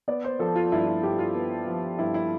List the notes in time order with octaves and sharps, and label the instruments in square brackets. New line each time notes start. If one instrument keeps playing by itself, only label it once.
[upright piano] B3 D5
C5
F3 A4
F4
G2 E4
F4
G2 G4
F4
B3
F3
G2 E4
E4